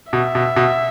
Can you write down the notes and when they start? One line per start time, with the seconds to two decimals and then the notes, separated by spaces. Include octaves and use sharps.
0.12 B2 E5
0.35 B2
0.56 B2